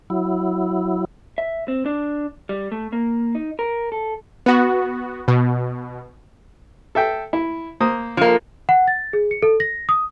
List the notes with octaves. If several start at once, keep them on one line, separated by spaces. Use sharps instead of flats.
F#3 E4
E5
C4
D4
G3
A3
A#3
D#4
A#4
A4
B3 F#4
B2
A4 E5 G5
E4
A#3 C5 D#6
F3 A#3
F#5
A6
G#4
C#7
A4
A#6
D#6